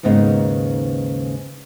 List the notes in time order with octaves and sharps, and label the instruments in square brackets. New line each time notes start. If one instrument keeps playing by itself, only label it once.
[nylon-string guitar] D#2 G#2 C#3 B3 D#4